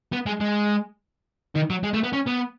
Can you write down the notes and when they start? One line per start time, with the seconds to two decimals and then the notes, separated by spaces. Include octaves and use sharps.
0.12 B3
0.26 G#3
0.40 G#3
1.55 D#3
1.70 F#3
1.83 G#3
1.94 A3
2.03 B3
2.13 C#4
2.26 B3